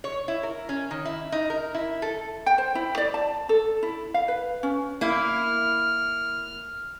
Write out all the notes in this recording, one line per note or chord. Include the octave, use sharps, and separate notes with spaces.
C#5
E4
A#4
C#4
D#3
E4
D#4
A#4
E4
A4
G5
C5
E4
D5
A5
A4
E4
F5
B4
C#4
A#3 E4 F6